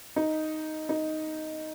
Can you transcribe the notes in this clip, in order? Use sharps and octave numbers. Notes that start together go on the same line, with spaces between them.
D#4
D#4